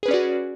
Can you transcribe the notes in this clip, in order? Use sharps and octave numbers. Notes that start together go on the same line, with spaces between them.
C#4 F#4 G#4 B4 D5